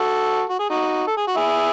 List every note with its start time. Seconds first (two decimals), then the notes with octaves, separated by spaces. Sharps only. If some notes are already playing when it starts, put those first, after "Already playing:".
Already playing: F#4 A4
0.49 F#4
0.59 G#4
0.70 D#4 F#4
1.07 A4
1.17 G#4
1.28 F#4
1.36 E4 G#4